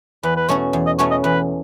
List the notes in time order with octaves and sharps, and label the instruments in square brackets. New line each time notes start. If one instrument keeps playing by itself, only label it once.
[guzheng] E2 [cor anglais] B4
[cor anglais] B4
[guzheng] B2 A3 C#4 F#4 [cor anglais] C#5
[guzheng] E2
[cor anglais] D#5
[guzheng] B2 A3 C#4 F#4 [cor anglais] C#5
[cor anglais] D#5
[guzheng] E2 [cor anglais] B4